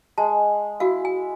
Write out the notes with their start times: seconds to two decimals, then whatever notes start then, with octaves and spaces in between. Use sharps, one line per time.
0.18 G#3 A5
0.80 E4 F#4 F5
1.05 G#5